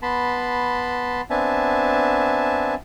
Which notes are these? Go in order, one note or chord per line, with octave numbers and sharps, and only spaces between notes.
B3 A5 B5 C6
B3 C4 D4 E5 G#5 A5